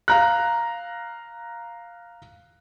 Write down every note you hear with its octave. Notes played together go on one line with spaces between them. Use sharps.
F5 A#5 F#6